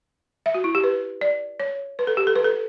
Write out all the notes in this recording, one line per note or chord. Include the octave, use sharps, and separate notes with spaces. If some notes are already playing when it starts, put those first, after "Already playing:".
E5
F#4
E4
G4
B4
D5
C#5
B4
A4
G4
A4
B4
A4